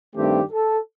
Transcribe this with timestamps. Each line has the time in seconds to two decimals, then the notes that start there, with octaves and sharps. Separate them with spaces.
0.16 G2 D#3 A3 C4 G4
0.52 A4